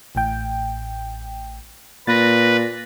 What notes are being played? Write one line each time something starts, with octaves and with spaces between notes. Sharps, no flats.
A1 A2 G5
A#2 B4 A6 A#6